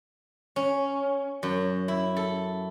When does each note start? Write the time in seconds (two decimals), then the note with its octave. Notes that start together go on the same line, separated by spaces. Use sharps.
0.56 C#4
1.43 F#2
1.88 E4
2.16 A4